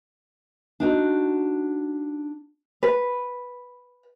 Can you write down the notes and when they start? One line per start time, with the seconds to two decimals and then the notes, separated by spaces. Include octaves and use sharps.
0.80 D4 D#4 F#4
2.83 B4